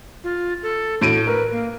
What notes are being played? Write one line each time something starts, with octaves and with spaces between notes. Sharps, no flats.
F4
A4
A2 F#4 D7 D#7
A#4 B4
A#3